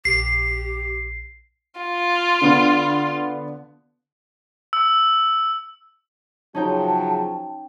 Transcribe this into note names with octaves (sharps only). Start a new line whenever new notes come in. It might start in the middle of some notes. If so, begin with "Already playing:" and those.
A#1 G4 C7
F4
D3 B3
E6
C#3 F3 F#3 C#4 D#4 G5 A5